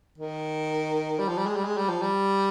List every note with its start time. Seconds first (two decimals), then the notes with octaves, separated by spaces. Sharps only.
0.18 D#3
1.19 G3
1.28 F3
1.38 G3
1.46 G#3
1.56 G3
1.65 G#3
1.77 G3
1.89 F3
2.02 G3